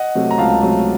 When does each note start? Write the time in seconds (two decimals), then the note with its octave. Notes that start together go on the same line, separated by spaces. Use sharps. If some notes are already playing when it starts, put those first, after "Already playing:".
Already playing: D#5 F#5
0.15 C3 F#3 A3
0.31 A#5
0.38 C#2 F5 A5
0.61 C3 F#3 A3